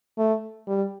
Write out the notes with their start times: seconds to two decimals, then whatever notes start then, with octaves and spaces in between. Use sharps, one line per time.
0.18 A3
0.68 G3